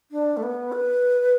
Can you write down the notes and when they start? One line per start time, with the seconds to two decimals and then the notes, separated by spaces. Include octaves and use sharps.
0.11 D4
0.37 A3
0.43 B3
0.72 B4